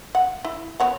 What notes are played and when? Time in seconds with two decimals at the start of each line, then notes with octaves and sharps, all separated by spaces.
0.15 F#5
0.45 E4
0.80 B3 C#5 F#5